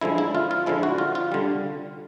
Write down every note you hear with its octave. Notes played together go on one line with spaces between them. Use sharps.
D3 F3 G#3 E4
E4
F4
F4
D3 F3 G#3 E4
F#4
F4
F4
D3 G3